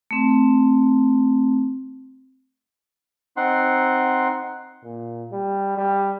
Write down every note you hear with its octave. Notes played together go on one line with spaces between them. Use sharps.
A3 C4
C4 D#4 F#5 C6
A#2
G3
G3